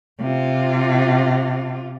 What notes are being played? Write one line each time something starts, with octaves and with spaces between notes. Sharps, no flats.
C3 F4